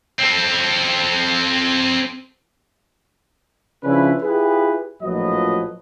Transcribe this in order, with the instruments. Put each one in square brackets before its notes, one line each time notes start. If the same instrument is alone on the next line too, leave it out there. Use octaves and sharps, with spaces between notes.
[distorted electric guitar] C4 A4
[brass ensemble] C#3 F3 C#4 D4 E4 B4
E4 F4 G4 G#4 B4
A#1 A2 F3 F#3 B4 D#5